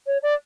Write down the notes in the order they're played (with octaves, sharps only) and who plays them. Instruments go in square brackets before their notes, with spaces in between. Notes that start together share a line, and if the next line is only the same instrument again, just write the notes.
[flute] C#5
D5